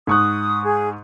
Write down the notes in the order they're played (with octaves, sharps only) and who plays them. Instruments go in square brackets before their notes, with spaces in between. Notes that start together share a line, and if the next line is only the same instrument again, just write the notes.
[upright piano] G#2 C#6 F#6 [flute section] D#6
[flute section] G#4